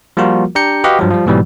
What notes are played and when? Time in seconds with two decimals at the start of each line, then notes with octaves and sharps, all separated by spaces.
0.17 F3 G3 A#3 F4 F#4 A#4
0.55 D4 G4 A#5 G6 C#7
0.84 F#4 G4 B4 D#5 F5 F#5
0.99 G2 F3 F#3
1.11 F3 G3
1.26 G#2 B2 E3 F#3 G3